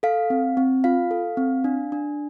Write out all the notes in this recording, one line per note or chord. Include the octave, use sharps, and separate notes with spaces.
A4 F5
C4
C4
F4 F5
A4
C4
D4
D4